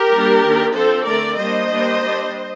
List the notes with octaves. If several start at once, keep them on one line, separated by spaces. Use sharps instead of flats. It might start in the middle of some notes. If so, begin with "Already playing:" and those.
Already playing: G4 A#4
G3 A#3 D4
D#3 A#3 D4
F3 C4 A4 C5
D3 A3 C4 A#4 D5
G3 A#3 D4 C5 D#5
G3 A#3 D4
G3 D4